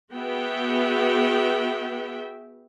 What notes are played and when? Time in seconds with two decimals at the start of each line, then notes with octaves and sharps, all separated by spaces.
0.14 B3 F#4 G#4 E5 G5